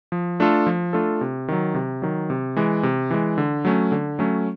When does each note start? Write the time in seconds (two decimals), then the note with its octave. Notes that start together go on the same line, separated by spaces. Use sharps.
0.12 F3
0.40 A3 D4 F4 A4
0.67 F3
0.93 A3 D4 F4 A4
1.21 C3
1.48 D#3 F#3
1.74 C3
2.02 D#3 F#3
2.30 C3
2.56 E3 G#3
2.83 C3
3.11 E3 G#3
3.38 D3
3.65 F#3 A3 C#4
3.92 D3
4.19 F#3 A3 C#4